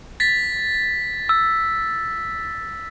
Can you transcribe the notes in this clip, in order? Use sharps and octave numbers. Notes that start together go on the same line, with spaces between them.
A6 B6
E6